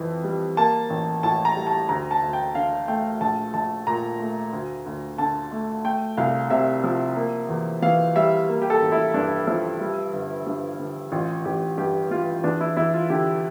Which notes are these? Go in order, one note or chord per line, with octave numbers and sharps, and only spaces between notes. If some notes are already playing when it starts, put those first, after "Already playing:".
Already playing: F2 E3
G3
A#3 A5
A1
A2 A5
A#5
G3
A5
D2 A#5
A5
D2
G5
D3 F5
A3 G5
A#1 A5
A#1 A5
A#2 A#5
A3
D2
D2
D3 A5
A3
A3 G5
C2 F5
C3 E5
F3
A#3
E2
E3 F5
G3 E5
A#3
G4
A4
A1
E4
G2 D4
F3 E4
G3
G1
G2
D3
A1 F4
A1 G4
G2 G4
E3 F4
E2 D4
E4
E2 E4
F4
D3 G4